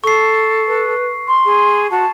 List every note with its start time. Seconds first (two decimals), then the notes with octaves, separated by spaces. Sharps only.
0.04 A4 C#6 C7
0.67 B4
1.28 C6
1.45 G#4
1.91 F#4 A5